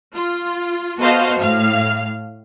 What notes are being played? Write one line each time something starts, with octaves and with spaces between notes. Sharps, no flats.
F4
B3 F#4 A4 C5 D#5 F5
A2 F5 F6